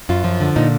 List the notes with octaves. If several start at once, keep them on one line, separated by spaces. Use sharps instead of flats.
F#2 F4
F3
D3
A#2 D#4